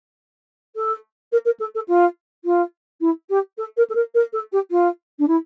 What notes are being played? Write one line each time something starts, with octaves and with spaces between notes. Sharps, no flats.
A4
A#4
A#4
A4
A4
F4
F4
E4
G4
A4
A#4
A4
A#4
A#4
A4
G4
F4
D4
E4